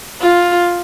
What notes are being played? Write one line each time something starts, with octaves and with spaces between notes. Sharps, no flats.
F4